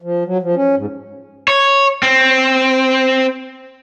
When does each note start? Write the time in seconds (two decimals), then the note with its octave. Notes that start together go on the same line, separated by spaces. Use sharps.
0.02 F3
0.25 F#3
0.43 F3
0.56 C#4
0.76 G#2
1.48 C#5
2.03 C4